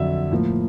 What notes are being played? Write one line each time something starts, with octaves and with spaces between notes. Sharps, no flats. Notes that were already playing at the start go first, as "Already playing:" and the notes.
Already playing: F2 D3 F#3 E5
A2 F3 A#3